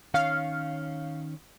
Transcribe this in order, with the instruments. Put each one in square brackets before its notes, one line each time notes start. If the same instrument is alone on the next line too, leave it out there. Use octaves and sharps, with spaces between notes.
[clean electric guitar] D#3 C#4 C#5 [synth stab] F5